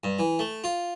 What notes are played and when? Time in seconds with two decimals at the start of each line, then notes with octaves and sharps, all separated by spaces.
0.04 G2
0.19 E3
0.39 A3
0.64 F4